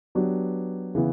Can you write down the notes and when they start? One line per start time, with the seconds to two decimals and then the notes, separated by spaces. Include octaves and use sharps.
0.15 F#3 B3 D4 G4 B4
0.95 C#3 E3 B3